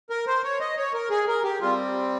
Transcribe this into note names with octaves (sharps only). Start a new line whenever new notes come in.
A#4
C5
C#5
D#5
C#5
A#4
G#4
A#4
G4
G3 C4 F4